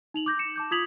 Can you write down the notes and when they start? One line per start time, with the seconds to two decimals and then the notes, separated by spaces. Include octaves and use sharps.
0.14 D#4 F7 F#7
0.26 D6 G6 A#6
0.39 C#7 E7
0.56 A5 D6 G6
0.71 F4 D#6 G#6 B6 F7 F#7